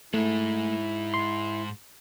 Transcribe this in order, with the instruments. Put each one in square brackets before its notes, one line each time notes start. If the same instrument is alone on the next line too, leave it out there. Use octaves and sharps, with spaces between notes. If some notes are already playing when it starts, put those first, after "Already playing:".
[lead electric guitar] G#2 G#3 [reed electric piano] A3 [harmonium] E4
[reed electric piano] C6